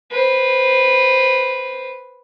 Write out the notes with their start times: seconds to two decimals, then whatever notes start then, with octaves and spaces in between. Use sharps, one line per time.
0.10 B4 C5